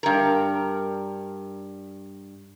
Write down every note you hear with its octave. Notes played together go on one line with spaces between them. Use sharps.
G2 A#4